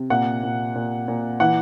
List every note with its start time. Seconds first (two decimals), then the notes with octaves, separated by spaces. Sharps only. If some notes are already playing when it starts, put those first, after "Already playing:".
Already playing: C3
0.10 A#2 F#5
0.43 A#2
0.75 A#2
1.08 A#2
1.40 E3 F#5